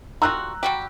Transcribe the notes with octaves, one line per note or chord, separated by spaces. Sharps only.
G3 F4 F#4 A#5 E6 F#6
G3 F#4 G4